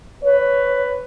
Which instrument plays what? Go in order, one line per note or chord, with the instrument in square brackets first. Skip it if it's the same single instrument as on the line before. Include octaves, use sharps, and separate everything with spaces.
[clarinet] B4 [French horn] C#5